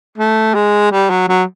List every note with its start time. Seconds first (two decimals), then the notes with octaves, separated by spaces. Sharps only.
0.18 A3
0.54 G#3
0.91 G3
1.10 F#3
1.28 F#3